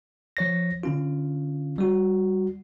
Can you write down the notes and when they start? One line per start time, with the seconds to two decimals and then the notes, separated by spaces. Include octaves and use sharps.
0.37 F3 C#5 A#6
0.83 D3 C#4 F4
1.78 G3 F#4